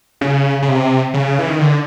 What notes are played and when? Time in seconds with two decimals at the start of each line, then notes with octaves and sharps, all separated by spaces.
0.21 C#3
0.62 C#3
0.69 C3
1.14 C#3
1.39 E3
1.49 D#3
1.61 D3